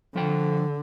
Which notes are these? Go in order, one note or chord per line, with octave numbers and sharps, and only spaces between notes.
D3 F3 G5